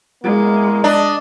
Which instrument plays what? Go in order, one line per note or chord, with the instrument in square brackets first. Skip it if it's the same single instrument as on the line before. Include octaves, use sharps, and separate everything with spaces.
[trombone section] E2 A#3 [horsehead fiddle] G#3
[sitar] D4 [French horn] D#5